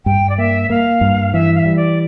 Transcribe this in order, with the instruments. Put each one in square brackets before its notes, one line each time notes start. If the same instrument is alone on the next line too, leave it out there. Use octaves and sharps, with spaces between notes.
[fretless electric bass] G2 [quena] G5
[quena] D5
[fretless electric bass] A#3 [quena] E5
[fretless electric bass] A#3 [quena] F5
[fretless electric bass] G2
[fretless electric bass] E3 [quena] E5
[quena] F5
E5
[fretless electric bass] G3
[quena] D5